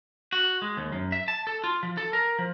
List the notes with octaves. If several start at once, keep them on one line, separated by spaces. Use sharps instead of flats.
F#4
G#3
D#2
F#2
E5
A5
A4
F4
F3
A4
A#4
F3